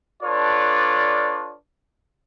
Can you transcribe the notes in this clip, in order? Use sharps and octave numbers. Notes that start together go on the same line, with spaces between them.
D4 F4 A4 B4 C#5 D5